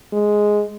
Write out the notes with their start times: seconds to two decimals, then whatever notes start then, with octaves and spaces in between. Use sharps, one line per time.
0.13 G#3